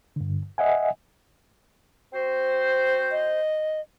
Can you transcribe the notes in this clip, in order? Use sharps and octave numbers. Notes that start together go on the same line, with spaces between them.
G2 D3
D#5 E5 F#5 G#5
C4 F#4 C5
D#5